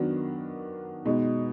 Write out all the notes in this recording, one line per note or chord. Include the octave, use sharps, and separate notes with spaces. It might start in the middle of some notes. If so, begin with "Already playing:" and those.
Already playing: D#3 F#3 B3 D4 F#4
B2 G#3 D#4